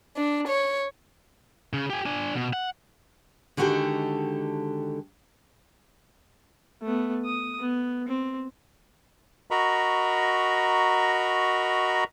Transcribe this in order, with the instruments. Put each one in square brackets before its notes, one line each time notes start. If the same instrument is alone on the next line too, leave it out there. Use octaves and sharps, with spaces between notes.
[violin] D4
C#5
[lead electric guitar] C#3
G4 G#5
D4 G#5
B2
F#5
[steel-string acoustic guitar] D3 D#3 G#3 F#4 G4 A4
[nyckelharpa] A3 B3
D#6
B3
C4
[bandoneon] F#4 A#4 D#5 A#5 B5 C#6